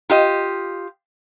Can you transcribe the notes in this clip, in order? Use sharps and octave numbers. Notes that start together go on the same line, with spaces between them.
F4 G4 D#5